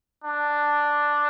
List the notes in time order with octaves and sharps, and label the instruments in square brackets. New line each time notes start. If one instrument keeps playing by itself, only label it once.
[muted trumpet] D4